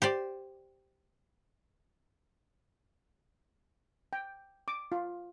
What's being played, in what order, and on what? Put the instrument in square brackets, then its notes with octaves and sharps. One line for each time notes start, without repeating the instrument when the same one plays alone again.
[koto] G4 C5 D5
[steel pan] G5
D6
F4